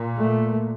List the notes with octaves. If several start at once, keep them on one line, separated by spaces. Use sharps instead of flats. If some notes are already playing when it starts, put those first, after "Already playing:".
Already playing: A#2
A3